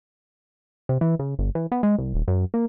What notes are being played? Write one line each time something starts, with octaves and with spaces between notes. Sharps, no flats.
C3
E3
C#3
G1
E3
B3
G#3
C2
D#1
F#2
A#3